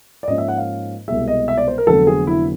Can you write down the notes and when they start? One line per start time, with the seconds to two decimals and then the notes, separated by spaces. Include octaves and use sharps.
0.23 D5
0.27 G#2 F3 A#3 C#4 D#5
0.38 E5
0.48 F#5
0.58 F5
1.08 C2 B2 G#3 E5
1.28 D#5
1.48 E5
1.58 D5
1.68 C5
1.78 A#4
1.87 F1 F2 D3 F#3 B3 A4
2.07 G#4
2.27 E4